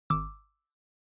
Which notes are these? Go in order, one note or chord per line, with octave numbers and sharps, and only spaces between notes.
G#1 D6 E6